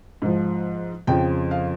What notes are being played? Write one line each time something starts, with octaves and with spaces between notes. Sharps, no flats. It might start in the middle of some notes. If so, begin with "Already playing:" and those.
G#2 F3
F2 C#3 F3 G5
F5